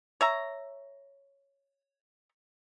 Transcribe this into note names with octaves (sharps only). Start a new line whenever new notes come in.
C#5 E5 A#5